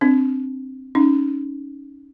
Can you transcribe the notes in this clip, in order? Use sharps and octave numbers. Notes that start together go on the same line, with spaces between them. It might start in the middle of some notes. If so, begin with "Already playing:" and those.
C4 D4
C#4 D#4